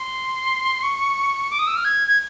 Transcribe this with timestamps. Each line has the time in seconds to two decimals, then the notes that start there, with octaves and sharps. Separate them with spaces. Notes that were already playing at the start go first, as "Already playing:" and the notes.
Already playing: C6
0.83 C#6
1.50 D6
1.59 D#6
1.67 E6
1.76 F6
1.85 G#6
2.07 G#6